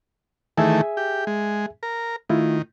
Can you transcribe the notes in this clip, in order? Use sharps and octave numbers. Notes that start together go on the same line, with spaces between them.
D#3 E3 A3 G#4 E5 G#5
G4
G#3
A#4
D#3 A3 E4 F4